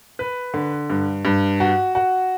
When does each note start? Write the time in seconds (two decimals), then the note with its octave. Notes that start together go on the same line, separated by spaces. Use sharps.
0.19 B4
0.54 D3
0.90 G2
1.25 G2
1.60 F#4
1.95 F#4